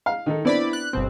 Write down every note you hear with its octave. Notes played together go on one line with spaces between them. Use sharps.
F5
D#3 D#4 A4
B3 C4 D4 E4 D5 B5
F#6
G1 B2 C4